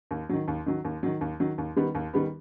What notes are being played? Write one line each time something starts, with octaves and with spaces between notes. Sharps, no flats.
D#2
D#3 F#3
D#2
D#3 F#3
D#2
D#3 F#3
D#2
D#3 F#3
D#2
D#3 G3 B3
D#2
D#3 G3 B3